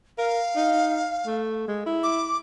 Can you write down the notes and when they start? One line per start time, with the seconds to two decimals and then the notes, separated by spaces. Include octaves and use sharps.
0.18 A#4 F5
0.56 D#4
1.26 A3
1.68 G#3
1.86 E4
2.03 D6